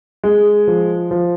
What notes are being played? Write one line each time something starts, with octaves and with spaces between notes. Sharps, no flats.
G#3
F3
F3